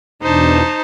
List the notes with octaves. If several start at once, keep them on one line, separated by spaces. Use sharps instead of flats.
E2 B2 D4 D#4 C5 A5